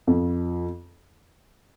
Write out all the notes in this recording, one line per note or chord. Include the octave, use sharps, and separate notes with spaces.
F2